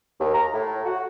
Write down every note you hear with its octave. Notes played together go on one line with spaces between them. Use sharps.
D#2
A#5
A2
F#4